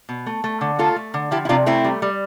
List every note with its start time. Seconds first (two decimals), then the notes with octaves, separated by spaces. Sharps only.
0.09 B2
0.26 A3
0.44 A3
0.61 D3
0.79 A3 F4 A4
0.96 A3
1.14 D3
1.31 F3 E4 G4
1.45 E4
1.49 C3 D4 F4
1.66 A3 C4 E4
1.84 G3
2.02 G3